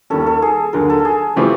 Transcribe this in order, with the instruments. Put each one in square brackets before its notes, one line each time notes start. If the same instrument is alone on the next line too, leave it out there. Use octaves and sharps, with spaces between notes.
[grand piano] D#2 D#3 G3 A#3 C#4 [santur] A4
[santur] A4
G#4
[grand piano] D#2 D3 F#3 [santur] A#4
[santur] A4
G#4
[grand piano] C#3 E3 A3 C4 F4 [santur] G4